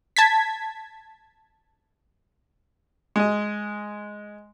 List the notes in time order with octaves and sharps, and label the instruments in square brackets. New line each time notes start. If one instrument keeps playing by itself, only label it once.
[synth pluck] A5 G#6 B6
[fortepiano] G#3 D#5